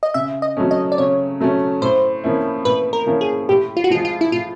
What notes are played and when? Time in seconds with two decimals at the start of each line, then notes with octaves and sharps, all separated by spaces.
0.03 D#5
0.14 C#3 E5
0.42 D#5
0.57 F#3 A3 C#4
0.71 D#5
0.92 D5
0.98 C#3 C#5
1.40 F#3 A3 C#4
1.82 A2 C5
2.24 F3 A#3 C#4 E4
2.65 A2 B4
2.93 A#4
3.06 F3 A#3 C#4 E4
3.21 G#4
3.49 A2 G4
3.77 F4
3.84 F#4
3.90 F3 G#3 F4
4.05 F4
4.21 E4
4.32 A2 F4